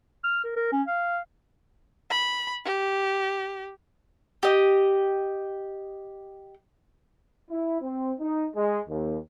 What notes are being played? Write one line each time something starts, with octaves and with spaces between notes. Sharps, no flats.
F6
A#4
A#4
C#4
F5
B5
G4
G4 D#5
E4
C4
D#4
G#3
D#2